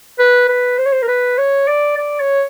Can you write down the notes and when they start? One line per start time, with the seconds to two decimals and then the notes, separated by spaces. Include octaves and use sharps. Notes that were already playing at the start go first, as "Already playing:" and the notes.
0.19 B4
0.49 B4
0.78 C5
0.86 C#5
0.92 C5
1.02 A#4
1.08 B4
1.38 C#5
1.68 D5
1.98 D5
2.20 C#5